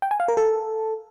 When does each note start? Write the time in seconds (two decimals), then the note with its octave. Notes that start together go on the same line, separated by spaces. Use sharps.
0.02 G5
0.11 G#5
0.20 F5
0.28 A#4
0.37 A4